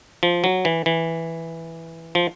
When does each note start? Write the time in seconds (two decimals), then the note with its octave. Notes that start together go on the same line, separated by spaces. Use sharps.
0.23 F3
0.44 F#3
0.65 E3
0.86 E3
2.15 F3